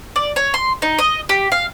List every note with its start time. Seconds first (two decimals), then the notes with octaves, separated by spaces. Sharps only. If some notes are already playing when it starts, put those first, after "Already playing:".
0.16 D5
0.36 C#5
0.54 C6
0.82 D#4
0.99 D#5
1.29 G4
1.52 F5